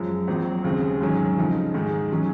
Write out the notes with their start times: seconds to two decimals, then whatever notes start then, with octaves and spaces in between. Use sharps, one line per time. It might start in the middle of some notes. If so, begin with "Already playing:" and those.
Already playing: F#2 F3 G#3
0.28 A#1 A#2 F#3 C4
0.64 D#2 C#3 G#3 C4
1.01 G#2 D#3 F#3 C#4 G#4
1.37 F2 C#3 F3 G#3 D#4
1.74 G#2 D#3 G#3 D#4 G#4
2.11 D#3 F#3 C#4 G#4